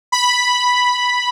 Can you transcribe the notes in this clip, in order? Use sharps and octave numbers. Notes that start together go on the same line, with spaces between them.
B5